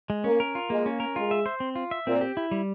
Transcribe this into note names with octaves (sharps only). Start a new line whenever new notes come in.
G#3
A#3 C#4
A#4
F4
G#3 A#3
C#4
A#4
G#3 F4
E5
C5
C4
F4
E5
A#2 C4
G4
E4
G3